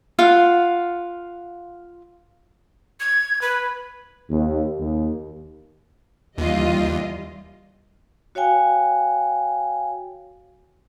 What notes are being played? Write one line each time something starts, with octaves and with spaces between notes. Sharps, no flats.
F4 F5 F#5
G#6
B4
D#2
D#2
D#2 E3 G3 F4 D#5
F#4 C#5 F5 G5 G#5